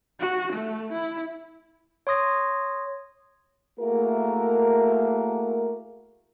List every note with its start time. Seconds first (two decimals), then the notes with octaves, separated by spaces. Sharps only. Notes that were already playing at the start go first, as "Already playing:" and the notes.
0.20 F#4
0.52 A3
0.92 E4
2.07 C#5 C6 D#6 A#6
3.80 A3 A#3 E4 F#4 G#4 A#4